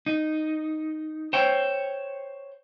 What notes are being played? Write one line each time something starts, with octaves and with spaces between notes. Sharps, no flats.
D#4
C5 C#5 G5